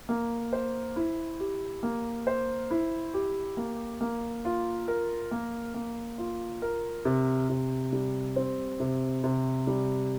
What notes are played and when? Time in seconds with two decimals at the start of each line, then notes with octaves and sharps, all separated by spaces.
0.09 A#3
0.53 C5
0.96 E4
1.40 G4
1.83 A#3
2.27 C5
2.71 E4
3.14 G4
3.57 A#3
4.01 A#3
4.45 F4
4.88 A#4
5.31 A#3
5.74 A#3
6.18 F4
6.62 A#4
7.05 C3
7.50 C3
7.93 G3
8.36 C4
8.80 C3
9.24 C3
9.67 G3